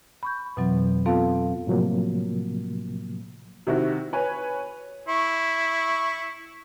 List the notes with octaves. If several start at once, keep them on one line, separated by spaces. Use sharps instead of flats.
B5 C#6 G6
F2 B2 E3 F#3 C4
B3 C4 F4 A4 F5 A5
A2 C3 F3 F#3 A#3
C3 D#3 E4 F#4
B4 C#5 G#5
E4 C#6